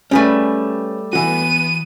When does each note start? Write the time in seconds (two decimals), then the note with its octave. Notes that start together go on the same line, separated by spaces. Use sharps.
0.11 G3 A3 C#4 G#4 B4
1.13 E3 B3 F#4 D#7